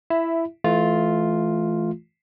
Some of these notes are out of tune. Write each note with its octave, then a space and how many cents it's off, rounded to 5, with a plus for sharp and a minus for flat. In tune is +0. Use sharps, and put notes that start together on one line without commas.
E4 +10 E5 +0
E3 +0 A3 -20 F4 +0